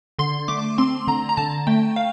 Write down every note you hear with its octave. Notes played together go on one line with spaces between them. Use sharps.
D3 C6
A3 D6
C4 C6
D3 A#5
A#5
D3 A5
A3 G5
F5